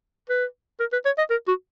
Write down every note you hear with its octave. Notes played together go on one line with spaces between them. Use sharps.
B4
A#4
B4
C#5
D#5
A#4
F#4